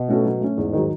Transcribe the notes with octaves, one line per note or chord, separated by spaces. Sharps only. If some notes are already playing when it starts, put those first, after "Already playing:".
Already playing: B2
A3 C#4 F#4 A4
F#3
A3 C#4
E2 G#2
D#3 F#3